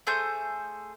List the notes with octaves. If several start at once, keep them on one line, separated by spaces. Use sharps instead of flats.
A3 G#4 C5 G6